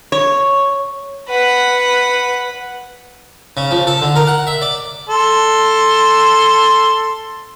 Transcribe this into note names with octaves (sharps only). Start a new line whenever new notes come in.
C#5
B4 F#5
C#3
F3
A4
D3
A#4
F#5
E5
D5
A4 C6